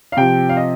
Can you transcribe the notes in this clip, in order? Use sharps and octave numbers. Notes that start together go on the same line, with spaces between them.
F5
C3 F3 G5
F5
D#5